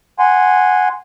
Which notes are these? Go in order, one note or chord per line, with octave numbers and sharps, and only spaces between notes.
F#5 G#5 C6